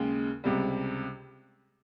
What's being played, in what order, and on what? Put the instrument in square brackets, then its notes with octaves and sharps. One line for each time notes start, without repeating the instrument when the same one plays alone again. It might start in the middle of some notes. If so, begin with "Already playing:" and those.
Already playing: [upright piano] D#2 C#3 G#3
C#2 C3 G3